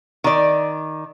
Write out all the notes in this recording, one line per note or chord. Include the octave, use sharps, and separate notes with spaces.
D#3 D5